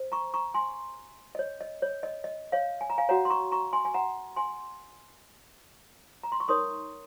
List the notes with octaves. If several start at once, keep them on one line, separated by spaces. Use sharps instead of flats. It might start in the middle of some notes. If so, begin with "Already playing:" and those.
Already playing: C5
A#5 C#6
A#5 C#6
G#5 C6
D#5
C#5
D#5
C#5
D#5
D#5
C#5 F5
G#5
A#5
F5 G#5
F#4 C#5 F#5 A#5
C6
A#5 C#6
A#5 C#6
G#5 C6
G#5
F#5 A#5
G#5 C6
A#5
C6
C#6
D#4 A#4 C#5 C6 D#6